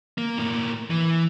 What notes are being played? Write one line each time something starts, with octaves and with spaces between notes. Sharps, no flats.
A#3
A2 A#3
E3